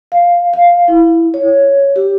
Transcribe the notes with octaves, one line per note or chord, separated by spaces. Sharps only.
F5
F5
E4
C#5
G4